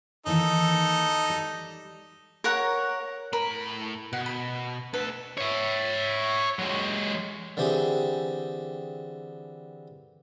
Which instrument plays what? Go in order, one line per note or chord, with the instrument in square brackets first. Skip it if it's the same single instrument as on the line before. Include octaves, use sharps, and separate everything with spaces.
[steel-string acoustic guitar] D#3 E3 A#3 [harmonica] D#4 A4
[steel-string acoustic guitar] G3
[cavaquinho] A#4 C#5 F#5 A#5
[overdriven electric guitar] A2 B5 [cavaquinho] A#4
[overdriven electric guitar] B2 [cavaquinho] F#5
[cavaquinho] B5
[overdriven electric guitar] D2 A4 [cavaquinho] B4
[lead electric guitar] C#5 E5
F#3 G#3
[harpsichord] D3 E3 C4 G4 G#4